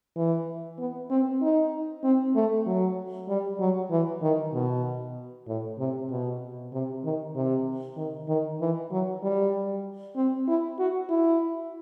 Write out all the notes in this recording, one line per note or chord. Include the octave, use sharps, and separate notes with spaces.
E3
B3
C4
D#4
C4
A3
F#3
G3
F#3
E3
D#3
B2
A2
C3
B2
C3
D#3
C3
D#3
D#3
E3
F#3
G3
C4
E4
F#4
E4